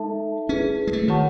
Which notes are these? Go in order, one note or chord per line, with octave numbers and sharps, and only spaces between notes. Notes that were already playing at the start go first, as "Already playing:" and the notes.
Already playing: G#3 D#4 A4 E5 A5
C#4 E4 G#4 B4
G#3
A3
D#3 F#4 C#5 F#5 A5 C#6